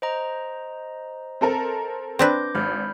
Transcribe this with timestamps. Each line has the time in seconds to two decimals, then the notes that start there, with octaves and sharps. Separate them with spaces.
0.02 C5 D#5 A#5
1.41 C4 A4 A#4
2.19 C4 D4 B4 D6 G6 A#6
2.55 G#1 B5 F6 G6